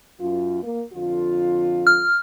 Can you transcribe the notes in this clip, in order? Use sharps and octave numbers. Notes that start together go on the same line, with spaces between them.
F#2 F4
A#3
F2 D3 F4
F6